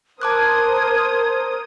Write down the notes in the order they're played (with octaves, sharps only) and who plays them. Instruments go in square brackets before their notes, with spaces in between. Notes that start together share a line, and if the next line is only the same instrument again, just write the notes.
[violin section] A#4 C5 D#6 [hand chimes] A5 D6 F#6 [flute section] G#6